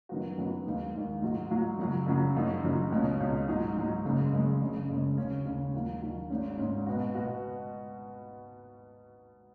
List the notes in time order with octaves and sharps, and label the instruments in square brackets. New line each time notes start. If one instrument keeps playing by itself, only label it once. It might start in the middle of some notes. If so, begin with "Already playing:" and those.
[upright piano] F#2 D#3 F#3 B3 F#4
F#2 D#3 F#3 B3 F#4
D#2 D#3 G#3
D#2 D#3 G#3
G#2 F#3 D#4 F#4
G#2 F#3 D#4 F#4
F#2 C#3 F#3
F#2 C#3 F#3
F#1 F#2 F#3 D#4
F#1 F#2 F#3 D#4
C#2 B2 G#3 C#4
C#2 B2 G#3 C#4
G#2 F#3 D#4
G#2 F#3 D#4
F#1 F#2 C#3 G#3
F#1 F#2 C#3 G#3
F#1 F#2 C#3 G#3
F#1 F#2 C#3 G#3
D#2 C#3 G#3 C#4
D#2 C#3 G#3 C#4
D#2 D#3 F#3
D#2 D#3 F#3
G#1 G#2 G#3 C#4
G#1 G#2 G#3 C#4
B2 B3 F#4
B2 B3 F#4